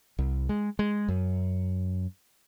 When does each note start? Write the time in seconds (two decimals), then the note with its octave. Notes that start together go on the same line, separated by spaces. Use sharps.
0.19 C2
0.49 G#3
0.79 G#3
1.08 F#2